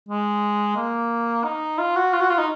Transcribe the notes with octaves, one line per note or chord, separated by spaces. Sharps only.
G#3
A#3
D#4
F4
F#4
F4
F#4
F4
D#4